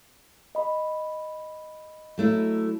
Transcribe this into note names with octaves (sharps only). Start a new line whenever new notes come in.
D#5 B5
F#3 A3 E4